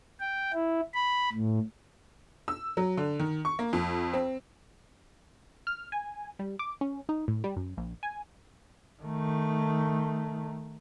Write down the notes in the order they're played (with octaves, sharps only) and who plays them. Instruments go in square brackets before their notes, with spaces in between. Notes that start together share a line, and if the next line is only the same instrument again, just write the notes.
[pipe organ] G5
E4
B5
A2
[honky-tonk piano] E6
F#3
D3
D#3
C#6
A#3
F2
C4
[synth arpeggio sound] F6
G#5
G3
D6
C#4
D#4
A2
G3
F#2
A#1
G#5
[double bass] D#3 A3